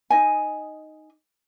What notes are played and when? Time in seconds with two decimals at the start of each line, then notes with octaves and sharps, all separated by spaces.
0.10 D#4 D#5 G#5